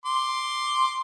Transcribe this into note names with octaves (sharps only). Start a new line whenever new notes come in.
C6 D6